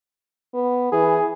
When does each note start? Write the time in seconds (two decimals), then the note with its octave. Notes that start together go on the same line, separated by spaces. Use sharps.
0.54 B3
0.92 E3 G#4